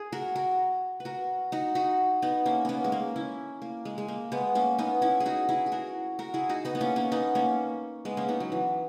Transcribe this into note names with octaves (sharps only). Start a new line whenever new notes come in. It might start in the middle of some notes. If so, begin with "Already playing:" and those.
Already playing: G#4
F#4 A#4
F#4 A#4
B4
F#4 A#4
D#4 F#4
D#4 F#4
B3 D#4
A#3 C#4
A#3 B3 C#4
G#3
A#3
C#4 E4
A#3
G#3
G#3
A#3
G#3 B3
A#3 C#4
B3 D#4
C#4 E4
G#4
D#4 F#4
E4 G#4
G#4
F#4 A#4
F#4 A#4
E4 G#4
D#4 F#4
B3 D#4
B3
A#3 C#4
A#3 C#4
B3 D#4
A#3 C#4
G#3 B3
A#3 C#4
B3 D#4
F#3
E3